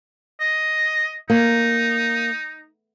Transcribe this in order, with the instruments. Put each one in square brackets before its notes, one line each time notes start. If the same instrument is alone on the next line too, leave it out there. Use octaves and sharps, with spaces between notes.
[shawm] D#5
[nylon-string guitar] A#3 [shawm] D#4